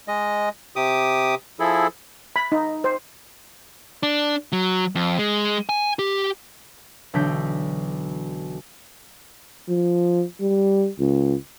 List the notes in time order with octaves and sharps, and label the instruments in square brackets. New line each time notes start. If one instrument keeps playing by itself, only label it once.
[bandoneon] G#3 D#5
C3 G4 D6 D#6
F3 E4 G#4 A4
[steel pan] B5
D#4
C5
[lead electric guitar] D4
F#3
F2
G#3
G#5
G4
[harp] B1 D3 E3 D4 G6 B6
[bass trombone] F3
G3
C#2